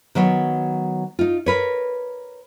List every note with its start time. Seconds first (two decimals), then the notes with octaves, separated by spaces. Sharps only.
0.15 D#3 F#3 B3 C#5
1.19 D#4 F4
1.46 A#4 B4 C#5